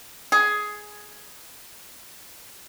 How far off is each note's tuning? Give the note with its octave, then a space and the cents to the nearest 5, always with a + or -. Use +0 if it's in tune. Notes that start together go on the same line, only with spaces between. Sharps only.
G#4 +10